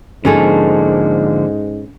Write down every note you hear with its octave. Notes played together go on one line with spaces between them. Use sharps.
G#2 D3 F3 A#3 C#4 G#4 A4